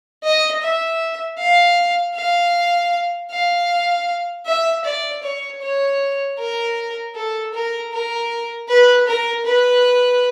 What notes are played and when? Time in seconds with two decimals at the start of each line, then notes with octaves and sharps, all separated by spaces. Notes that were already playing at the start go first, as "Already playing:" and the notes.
0.23 D#5
0.62 E5
1.38 F5
2.15 F5
3.31 F5
4.46 E5
4.84 D5
5.23 C#5
5.61 C#5
6.39 A#4
7.15 A4
7.54 A#4
7.93 A#4
8.68 B4
9.07 A#4
9.46 B4